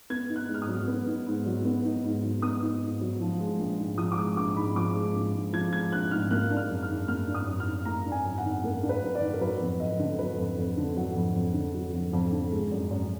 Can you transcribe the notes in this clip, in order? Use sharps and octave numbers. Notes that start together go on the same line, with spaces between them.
B3 G#6
D#4
F#6
G#2
F6
D#6
F#3
B3
D#4
G#2
F#3
B3
D#4
G#2
F#3
B3 D#6
D#4
G#2
F#3
F3
G#3
A#1
G#2
F3 D#6
D6
G#3 D#6
A#1 D6
G#2 B5
F3 D6
G#3
A#1
G#2
F3 G#6
G#3 G#6
A#1 F#6
G#2 F6
A#3 F#6
D4
F6
F#2
F6
D#3
A#3 F6
D4
D#6
F#2
F6
D#3
A#3 A#5
D4
G#5
F#2
F#5
D#3
A#3 A#4
D4
B4
F#2
D5
D#3
A#4
F#3 B4
F2
F2 D#5
D3
F#3 B4
F2
F2
D3
F#3 F#5
F2
F2
D3
F#3
F2
F2
D3
G#3
F#2
F#2